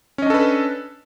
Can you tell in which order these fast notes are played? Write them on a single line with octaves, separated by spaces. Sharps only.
C#4 D#5 D4 A4 B4